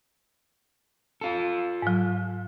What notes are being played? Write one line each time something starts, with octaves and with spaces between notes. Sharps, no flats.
F4 A4
G#2 F#3